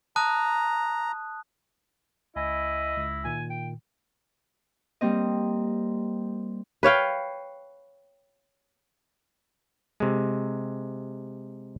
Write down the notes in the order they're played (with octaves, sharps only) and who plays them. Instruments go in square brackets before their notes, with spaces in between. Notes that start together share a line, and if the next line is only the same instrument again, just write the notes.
[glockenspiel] A5 D#6 F#6 [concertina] A#5
[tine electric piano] C#2 G#5 B5 [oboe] E4 [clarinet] D#5
[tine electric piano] C#2 A#6
[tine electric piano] A#2 D#3 [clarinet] G#5
[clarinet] G5
[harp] G3 A#3 C4 D#5
[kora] B4 C#5 F5 G5
[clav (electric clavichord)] C3 G#3